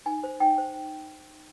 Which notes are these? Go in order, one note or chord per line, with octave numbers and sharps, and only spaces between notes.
D#4 G#5
C5
D#4 G5
C5